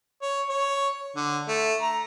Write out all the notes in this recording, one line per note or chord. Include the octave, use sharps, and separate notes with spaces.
C#5
C#5
D3
A3
A#5